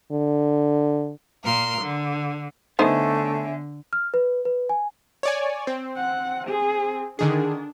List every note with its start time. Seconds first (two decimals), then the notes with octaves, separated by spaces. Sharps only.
0.12 D3
1.43 A#2 A#4 C6
1.80 D3
2.79 D3 A3 B3 D#4 C5 C#5 E5 G#5
3.93 F6
4.14 B4
4.45 B4
4.69 G#5
5.23 C#5 D5 G#5
5.67 C4
5.97 F#5
6.48 G#4
7.19 D3 D#3 D4 G#4